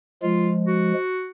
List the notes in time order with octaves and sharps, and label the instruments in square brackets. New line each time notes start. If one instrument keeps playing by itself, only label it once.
[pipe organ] F3 G#3 [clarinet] F4
[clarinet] F#4